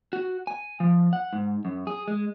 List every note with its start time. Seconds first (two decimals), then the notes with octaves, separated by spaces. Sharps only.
0.13 F#4
0.47 G#5
0.80 F3
1.13 F#5
1.33 G#2
1.65 F#2
1.87 G#4
2.08 G#3